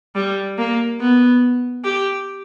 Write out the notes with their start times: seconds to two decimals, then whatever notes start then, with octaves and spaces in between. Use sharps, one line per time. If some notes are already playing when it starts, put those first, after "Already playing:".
0.16 G3
0.58 A#3
1.00 B3
1.84 G4